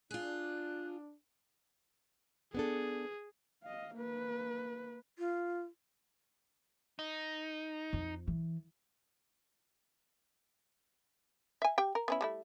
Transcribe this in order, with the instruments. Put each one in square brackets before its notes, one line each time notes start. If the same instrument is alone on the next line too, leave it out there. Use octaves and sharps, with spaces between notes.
[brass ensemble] D4 [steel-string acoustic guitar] F4 G#4 [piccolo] F#6
[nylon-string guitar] B3 D4 A4 [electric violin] G#4
[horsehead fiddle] D#5 F5
A#3 B4
[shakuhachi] F4
[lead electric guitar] D#4
[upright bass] F2
E3
[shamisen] E5 G#5
G4 G5
A#4
B3 C#4 E4
G3 A3 E4